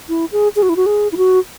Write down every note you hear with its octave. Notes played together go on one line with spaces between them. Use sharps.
E4
G#4
G#4
F#4
E4
F#4
G#4
E4
F#4